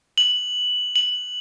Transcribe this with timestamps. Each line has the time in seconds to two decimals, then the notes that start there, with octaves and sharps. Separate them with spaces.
0.18 F#7
0.96 F#7